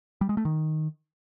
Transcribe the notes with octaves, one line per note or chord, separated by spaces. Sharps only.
G3
G#3
A3
D#3